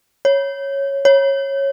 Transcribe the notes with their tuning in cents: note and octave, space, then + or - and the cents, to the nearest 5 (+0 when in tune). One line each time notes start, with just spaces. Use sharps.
C#5 -5
C#5 -15